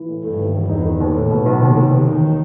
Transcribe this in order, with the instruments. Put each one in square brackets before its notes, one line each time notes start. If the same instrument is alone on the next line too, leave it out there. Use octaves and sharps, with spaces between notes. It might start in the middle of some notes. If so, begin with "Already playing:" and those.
Already playing: [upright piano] E3
A2
[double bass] G2 [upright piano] A3
[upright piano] D#2
E1
[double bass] E2 [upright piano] D#4
[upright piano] D#3
D#2
[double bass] A2 [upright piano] A3
[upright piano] B2
B1
[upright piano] D#2 [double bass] C3
[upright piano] D#3
D#2
[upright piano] E1 [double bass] D#3